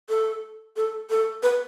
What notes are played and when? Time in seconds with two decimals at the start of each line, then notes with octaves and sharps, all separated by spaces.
0.09 A4
0.76 A4
1.10 A4
1.43 B4